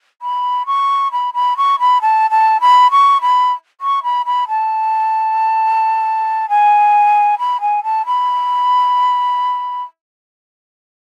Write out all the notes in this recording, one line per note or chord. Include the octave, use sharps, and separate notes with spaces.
B5
C#6
B5
B5
C#6
B5
A5
A5
B5
C#6
B5
C#6
B5
B5
A5
G#5
B5
G#5
A5
B5